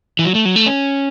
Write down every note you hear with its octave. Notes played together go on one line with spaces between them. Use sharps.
E3
F#3
A3
F#3
A3
C#4